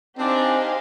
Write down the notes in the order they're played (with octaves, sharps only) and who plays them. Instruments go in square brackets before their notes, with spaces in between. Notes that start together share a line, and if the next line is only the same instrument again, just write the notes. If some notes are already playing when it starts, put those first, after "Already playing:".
[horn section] C4 D4 [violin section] D#4 G4 C5 F5 G#5